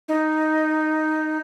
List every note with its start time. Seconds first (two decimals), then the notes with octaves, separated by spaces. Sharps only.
0.08 D#4